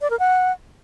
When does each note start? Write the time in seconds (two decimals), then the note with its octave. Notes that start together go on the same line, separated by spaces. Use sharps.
0.01 D5
0.10 A#4
0.19 F#5